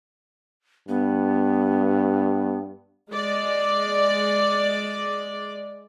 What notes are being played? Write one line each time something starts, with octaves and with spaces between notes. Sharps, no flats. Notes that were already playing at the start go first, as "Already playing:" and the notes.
G2 B3
G#3 D5